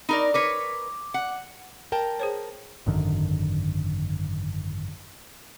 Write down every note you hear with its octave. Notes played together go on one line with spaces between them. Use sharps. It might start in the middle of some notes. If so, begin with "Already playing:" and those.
D#4 A#4 D5 A#5 B5
A#4 B4 C#5 D6
F#5
A#4 G5 A5
G#4 C5 C#5
G#1 F#2 D3 D#3